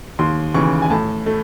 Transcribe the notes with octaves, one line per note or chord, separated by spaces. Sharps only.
D#2 C6
C#3 E3 C#6
G#5
A2 A5
A3